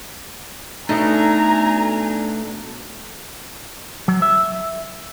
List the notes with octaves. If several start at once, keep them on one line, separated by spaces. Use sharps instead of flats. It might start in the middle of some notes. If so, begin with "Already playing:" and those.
B2 A3 D4 D#4 G#5 A#5
F#3
E5